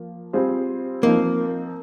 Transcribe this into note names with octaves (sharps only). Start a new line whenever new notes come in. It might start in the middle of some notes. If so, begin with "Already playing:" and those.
Already playing: F3 A#3 F4
G3 C4 F4 G#4 C5
F3 A#3 C4 D#4